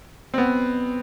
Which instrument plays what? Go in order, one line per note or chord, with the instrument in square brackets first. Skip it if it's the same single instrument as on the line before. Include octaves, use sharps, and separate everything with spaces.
[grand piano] C4
B3